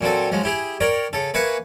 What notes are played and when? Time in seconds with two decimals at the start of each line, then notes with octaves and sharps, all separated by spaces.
0.01 A#2 F#3 C4 A4
0.31 F3 F#3 G#3
0.43 E4 G4 G#4
0.81 A#4 C#5 D5 G5
1.13 C#3 A4
1.34 A#3 B4 E5 G#5 C#6